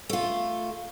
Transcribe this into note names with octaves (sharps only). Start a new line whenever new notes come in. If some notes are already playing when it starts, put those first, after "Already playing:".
A3 F4